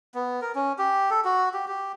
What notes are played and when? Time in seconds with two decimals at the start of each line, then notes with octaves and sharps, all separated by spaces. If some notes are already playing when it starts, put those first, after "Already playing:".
0.14 B3
0.42 A#4
0.55 C#4
0.79 G4
1.10 A4
1.25 F#4
1.54 G4
1.68 G4